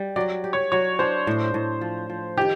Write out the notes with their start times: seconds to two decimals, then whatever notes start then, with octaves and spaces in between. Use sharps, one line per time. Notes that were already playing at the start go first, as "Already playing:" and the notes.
Already playing: G3
0.16 F#3 D5
0.44 G4
0.53 C#5
0.72 F#3 C#5
0.99 D4 C5
1.27 A2
1.54 A2
1.81 F3
2.10 F3
2.37 D#3 G4